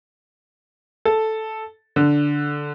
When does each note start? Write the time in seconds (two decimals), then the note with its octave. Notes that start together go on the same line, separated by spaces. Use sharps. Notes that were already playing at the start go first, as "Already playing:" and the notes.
1.05 A4
1.96 D3